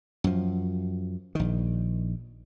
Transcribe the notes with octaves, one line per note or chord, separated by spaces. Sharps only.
F#2 F3
A#1 D#3